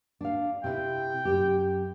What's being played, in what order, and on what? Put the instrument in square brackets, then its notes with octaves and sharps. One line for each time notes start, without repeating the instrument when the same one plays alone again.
[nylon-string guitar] D4 F5
[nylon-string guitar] C3 E4 [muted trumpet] G5
[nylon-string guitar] F#2 G4